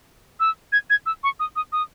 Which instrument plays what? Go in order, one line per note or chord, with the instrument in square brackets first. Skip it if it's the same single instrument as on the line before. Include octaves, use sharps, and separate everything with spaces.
[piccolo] E6
G#6
G#6
E6
C#6
D#6
D#6
D#6